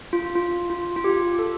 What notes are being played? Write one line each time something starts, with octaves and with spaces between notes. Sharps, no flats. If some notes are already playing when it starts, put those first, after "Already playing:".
F4
F4
F4
F4
G4
A4